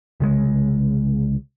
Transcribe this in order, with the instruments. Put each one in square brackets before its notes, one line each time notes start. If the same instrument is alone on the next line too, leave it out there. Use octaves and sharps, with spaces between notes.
[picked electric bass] C2 C#3 G#3